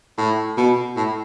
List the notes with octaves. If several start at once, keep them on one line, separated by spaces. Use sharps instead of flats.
A2
B2
A2